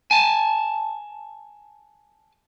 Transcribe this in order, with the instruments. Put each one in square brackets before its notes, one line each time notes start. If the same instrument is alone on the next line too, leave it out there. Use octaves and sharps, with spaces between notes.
[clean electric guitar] G#5 A5